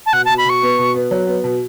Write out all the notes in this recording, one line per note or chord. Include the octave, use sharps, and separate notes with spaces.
A5
B2 F#5
A5
B2
B5
B2 C#6
B3
B2
B3
F#3
B3
B2